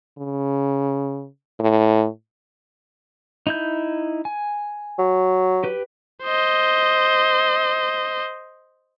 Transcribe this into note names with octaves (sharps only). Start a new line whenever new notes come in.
C#3
A2
D#4 E4 G6
G#5
F#3
G4 B4
C5 D#5